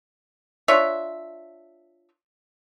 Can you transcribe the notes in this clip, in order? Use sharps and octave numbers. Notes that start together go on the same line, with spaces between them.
D4 F4 C#5 E5